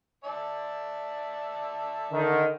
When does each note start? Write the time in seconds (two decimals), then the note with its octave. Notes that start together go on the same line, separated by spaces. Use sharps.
0.24 D5 E5 A5
2.12 D3 D#3